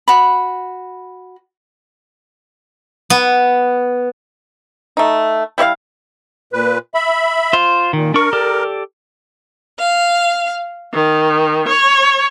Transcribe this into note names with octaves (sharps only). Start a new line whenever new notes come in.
F#4 B5
B3
A3 D#4
G3 E4 C#5 F5
A#2 B4
E5 B5
F4 C5
A#2 D#3
D4 A#4 C#6
G4 A4 D5
F5
D#3
C#5